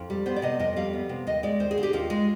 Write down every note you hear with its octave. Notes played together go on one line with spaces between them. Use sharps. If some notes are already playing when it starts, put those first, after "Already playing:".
Already playing: F2
G3
B3 C5
D5
C3 D#5
F2 D#5
G3 F5
B3
C3
D#2 D#5
G#3 D5
D#2 C5
G#4
D3
G4
D#2 F4
G#3